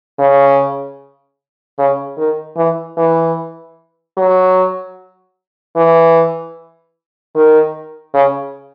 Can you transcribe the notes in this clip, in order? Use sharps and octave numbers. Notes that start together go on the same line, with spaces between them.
C#3
C#3
D#3
E3
E3
F#3
E3
D#3
C#3